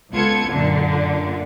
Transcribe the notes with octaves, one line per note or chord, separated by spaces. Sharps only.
C#2 B3 F4 A4 G#6 C#7
F#2 A#2 D3